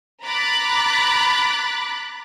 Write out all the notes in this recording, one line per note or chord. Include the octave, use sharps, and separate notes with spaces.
A#5 B5 D6 F#6 A6